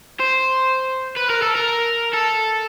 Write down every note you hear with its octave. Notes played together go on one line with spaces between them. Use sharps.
C5
B4
A#4
A4
A#4
A4